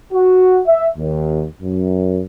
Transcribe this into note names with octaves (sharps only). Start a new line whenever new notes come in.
F#4
E5
D#2
F#2